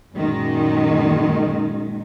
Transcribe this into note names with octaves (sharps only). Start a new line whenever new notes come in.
F#2 A#2 D#3 G#3